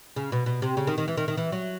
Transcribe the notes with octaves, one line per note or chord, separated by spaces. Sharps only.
C#3
B2
B2
C3
C#3
D#3
D#3
E3
D#3
D#3
E3
F#3